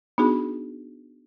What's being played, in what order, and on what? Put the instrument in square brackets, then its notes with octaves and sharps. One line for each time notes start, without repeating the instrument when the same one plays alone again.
[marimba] B3 D4 D#4 F#4 G#4